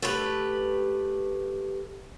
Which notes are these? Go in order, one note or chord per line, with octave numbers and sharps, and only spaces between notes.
A3 G4 B4